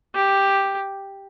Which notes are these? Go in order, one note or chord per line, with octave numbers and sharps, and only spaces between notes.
G4